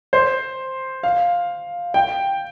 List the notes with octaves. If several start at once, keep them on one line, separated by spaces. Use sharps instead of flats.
C5
F5
G5